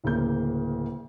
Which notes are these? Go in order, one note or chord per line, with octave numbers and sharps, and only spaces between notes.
D1 D2 C#3 A#3 G6